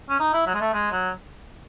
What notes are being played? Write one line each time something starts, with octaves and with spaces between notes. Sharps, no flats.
C#4
D#4
E4
F#3
G#3
A3
G#3
F#3